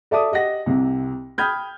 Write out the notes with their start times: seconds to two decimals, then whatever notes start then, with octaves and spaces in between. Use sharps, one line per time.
0.11 A4 D5 E5 A5 D6 D#6
0.32 G4 D#5 F#5 A#6
0.66 C2 C3
1.38 G5 B5 D#6 F6 G6 G#6